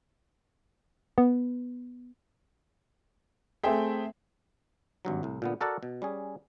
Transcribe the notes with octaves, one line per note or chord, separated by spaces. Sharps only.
B3
A3 C4 G#4 A4 E5 G5
G#1 G2 F#3
C2 A2
A#2 D3 B3
F#4 A4 A#4 D5 F#5 A5
B2
G3 C#4 G#4